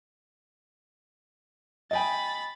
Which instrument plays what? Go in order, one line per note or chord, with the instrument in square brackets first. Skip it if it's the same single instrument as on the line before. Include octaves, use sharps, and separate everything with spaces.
[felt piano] D#5 G5 G#5 [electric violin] B5 A6